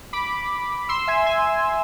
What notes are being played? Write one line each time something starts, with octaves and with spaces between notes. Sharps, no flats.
B5 D6
C6 E6
E5 G#5
E5 G#5